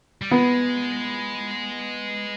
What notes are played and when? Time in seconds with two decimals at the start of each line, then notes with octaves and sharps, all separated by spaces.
0.22 G3
0.31 G#3 B3